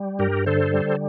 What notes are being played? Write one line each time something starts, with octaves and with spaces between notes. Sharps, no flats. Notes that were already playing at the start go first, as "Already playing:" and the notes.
Already playing: G3
G2 G4 A#4
D3 A4 C5
G3